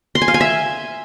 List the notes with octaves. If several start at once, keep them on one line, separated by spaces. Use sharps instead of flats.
C6
G#5
F5
G#5
E5